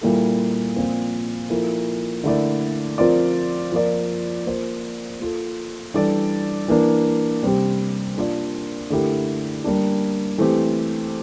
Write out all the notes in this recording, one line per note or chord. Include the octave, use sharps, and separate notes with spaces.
A#2 G3 A#3 E4 A4
A#2 F3 C4 F4
F3 A#3 E4 A4
D3 A3 E4 A#4 D5
F3 C4 F4 A#4 D5
F3 A#3 F4 A#4 D5
A#3 F4 C5
A#3 F4 A4
E3 G3 D4 A4 D5
E3 A#3 D4
C3 G3 C4 G4
A#3 D4 F4 A#4 D5
D3 A3 E4 G4 A#4
G3 A#3 D4
E3 A3 C4 G4